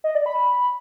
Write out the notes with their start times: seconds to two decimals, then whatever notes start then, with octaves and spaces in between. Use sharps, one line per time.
0.04 D#5
0.15 D5
0.26 B5